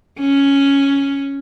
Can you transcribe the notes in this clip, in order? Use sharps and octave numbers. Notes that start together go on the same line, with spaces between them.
C#4